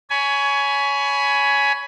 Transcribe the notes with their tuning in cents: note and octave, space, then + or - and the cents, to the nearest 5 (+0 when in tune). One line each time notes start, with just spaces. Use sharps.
C#5 +20 G#5 +15 B5 +0